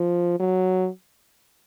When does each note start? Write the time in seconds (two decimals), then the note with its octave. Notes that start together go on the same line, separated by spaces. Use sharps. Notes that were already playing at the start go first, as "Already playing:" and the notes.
Already playing: F3
0.39 F#3